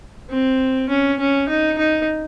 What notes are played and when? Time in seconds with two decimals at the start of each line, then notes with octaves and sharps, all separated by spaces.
0.30 C4
0.89 C#4
1.19 C#4
1.49 D#4
1.78 D#4